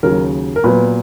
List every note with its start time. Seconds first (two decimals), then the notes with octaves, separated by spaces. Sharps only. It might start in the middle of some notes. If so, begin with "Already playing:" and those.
0.03 D#2 C#3 F#3 A#4
0.56 A#4
0.64 A#2 F#3 B3 B4